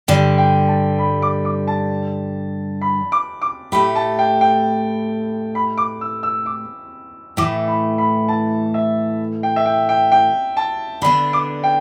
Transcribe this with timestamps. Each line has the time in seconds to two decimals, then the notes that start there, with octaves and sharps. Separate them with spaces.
0.08 G2 D3 G3 G5
0.38 G5
0.68 A5
0.99 B5
1.22 D6
1.45 D6
1.67 A5
2.81 B5
3.12 D6
3.42 D6
3.72 A2 A3 G4 B5
3.95 A5
4.19 G5
4.41 G5
5.55 B5
5.78 D6
6.01 E6
6.23 E6
6.46 D6
7.37 A2 E3 A3 D6
7.68 B5
7.98 B5
8.28 A5
8.74 E5
9.43 G5
9.56 E5
9.66 G5
9.89 G5
10.12 G5
10.57 A5
11.02 D3 B3 D4 B5
11.33 D6
11.64 G5